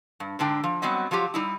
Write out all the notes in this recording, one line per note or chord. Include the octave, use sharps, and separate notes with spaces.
G2
G#2 D3 D4 G5
F3
F#3 G3 B3 C4 D#5
F3 F#3 F4 G4
G3 D#4 E4